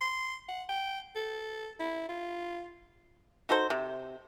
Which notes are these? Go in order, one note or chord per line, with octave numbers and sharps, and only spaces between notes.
C6
F#5
G5
A4
E4
F4
D#4 F#4 A4 C5
C3